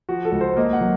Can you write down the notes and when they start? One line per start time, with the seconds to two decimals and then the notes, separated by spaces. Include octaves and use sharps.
0.09 F3 F#4
0.25 A4
0.32 C#2
0.41 C5
0.56 A#3 D#5
0.73 F#5
0.81 F#3